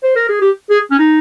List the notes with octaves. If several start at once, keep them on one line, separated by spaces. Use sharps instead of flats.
C5
A#4
G#4
G4
G#4
C#4
D#4